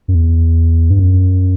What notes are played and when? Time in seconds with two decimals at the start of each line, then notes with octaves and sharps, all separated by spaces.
0.08 F#2
0.15 E2
0.90 G2
0.99 F#2